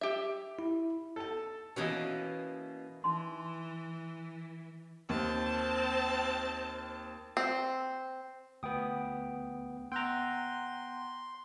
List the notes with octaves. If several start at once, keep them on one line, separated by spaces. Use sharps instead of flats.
G4 E5
E4
A4 A5
B2 E3 A#3 C#4 D#5
E3 D#4 C6
D#2 C4 A5
C4
D2 B3 G5 D#6
B3 G5 A#5 C6 F#6